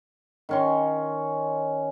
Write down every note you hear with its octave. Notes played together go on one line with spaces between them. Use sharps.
D#3 C#4 C6